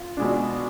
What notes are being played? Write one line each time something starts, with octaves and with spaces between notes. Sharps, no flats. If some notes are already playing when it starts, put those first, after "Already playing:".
Already playing: F4
B2 G#3 D4